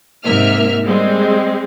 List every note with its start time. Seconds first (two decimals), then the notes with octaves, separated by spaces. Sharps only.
0.25 G#2 C3 A#3 E5 F6
0.84 G3 G#3 C4